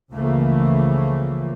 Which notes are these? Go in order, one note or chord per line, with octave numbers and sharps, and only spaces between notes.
C#2 C#3 E3 F3 A3 A#3